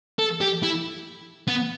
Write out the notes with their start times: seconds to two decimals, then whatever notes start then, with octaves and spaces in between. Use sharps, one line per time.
0.19 A4
0.41 G4
0.63 E4
1.48 B3